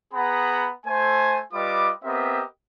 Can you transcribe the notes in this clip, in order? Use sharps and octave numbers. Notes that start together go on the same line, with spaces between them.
B3 G#4 F#5 A#5 B5
A3 C5 G#5
G3 F4 B4 D#5 D6
B3 C4 G4 A#4 D#5 E5